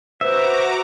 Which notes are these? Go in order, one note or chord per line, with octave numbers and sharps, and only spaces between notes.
F#4 B4 C5 E5 A#5 D6